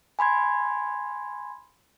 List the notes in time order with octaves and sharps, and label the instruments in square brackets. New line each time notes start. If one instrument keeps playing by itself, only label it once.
[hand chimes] G#5 B5 C6 G#6